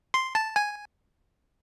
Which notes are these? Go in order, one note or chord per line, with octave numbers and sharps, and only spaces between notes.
C6
A5
G#5